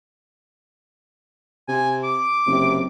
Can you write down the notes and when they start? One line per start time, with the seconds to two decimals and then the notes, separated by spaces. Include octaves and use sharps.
1.69 C3 G#5
2.04 D6
2.47 F#1 C3